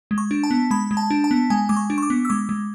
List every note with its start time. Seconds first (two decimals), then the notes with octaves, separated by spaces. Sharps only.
0.11 G#3
0.18 C#6
0.31 D4
0.44 A5
0.51 B3
0.71 G#3 B5
0.91 G#3
0.97 A5
1.10 D4
1.24 A5
1.31 B3
1.50 G#3 G#5
1.69 G#3 D6
1.77 C#6
1.90 D4
1.98 C#6
2.03 D6
2.10 B3
2.25 E6
2.30 G#3 D6
2.49 G#3